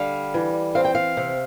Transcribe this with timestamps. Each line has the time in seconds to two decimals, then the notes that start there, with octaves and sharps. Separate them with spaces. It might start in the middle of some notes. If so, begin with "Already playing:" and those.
Already playing: D3 G3 F5
0.34 E3
0.75 C4 F5
0.85 G5
0.95 F5
1.17 C3